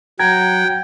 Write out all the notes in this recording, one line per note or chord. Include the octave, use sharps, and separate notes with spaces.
F#3 F#5 G5 A#5 G#6